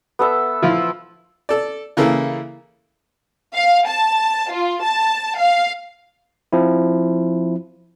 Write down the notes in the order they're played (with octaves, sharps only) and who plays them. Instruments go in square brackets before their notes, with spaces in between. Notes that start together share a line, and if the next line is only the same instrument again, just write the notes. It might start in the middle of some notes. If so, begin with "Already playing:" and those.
[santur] B3 A4 E5
[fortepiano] F3 E4 F4
A4 D5
C#3 E3 A#3 E4 A4
[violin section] F5
A5
F4
A5
F5
[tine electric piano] F3 C4 E4